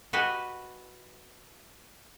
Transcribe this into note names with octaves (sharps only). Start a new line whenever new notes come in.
F#4 G4 B4 D#5 F#5 G#5